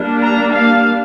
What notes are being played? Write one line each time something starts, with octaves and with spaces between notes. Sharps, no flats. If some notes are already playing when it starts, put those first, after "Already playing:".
Already playing: G3 A#3 D4
A#5
F5